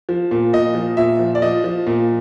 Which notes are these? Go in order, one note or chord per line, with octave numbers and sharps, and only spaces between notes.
F3
A#2
A#2 D#5
F3
A#2 E5
F3
D5
F3 D#5
F3
A#2